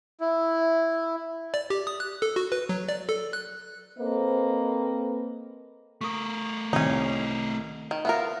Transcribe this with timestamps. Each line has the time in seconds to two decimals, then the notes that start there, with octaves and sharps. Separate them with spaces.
0.21 E4
1.54 D5
1.70 G4
1.87 D#6
2.00 F#6
2.22 A4
2.36 F#4
2.52 B4
2.69 F#3
2.89 D5
3.09 A4
3.33 F#6
3.99 A#3 C4 A4 B4 C5 D#5
6.01 A3 A#4 C#6 D#6
6.73 C2 C3 D#3 C#4 D#4
7.91 D#3
8.05 B3 F4 A#4 E5 F5